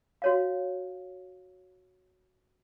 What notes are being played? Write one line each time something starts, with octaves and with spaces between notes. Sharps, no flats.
F#4 C#5 F5